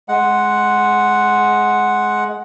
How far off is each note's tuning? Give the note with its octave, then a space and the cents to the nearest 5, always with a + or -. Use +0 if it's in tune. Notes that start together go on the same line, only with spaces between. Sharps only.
G#3 +15 F#5 +0